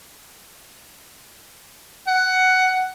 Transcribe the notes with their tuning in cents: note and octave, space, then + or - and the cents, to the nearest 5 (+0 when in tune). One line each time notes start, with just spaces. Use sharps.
F#5 +10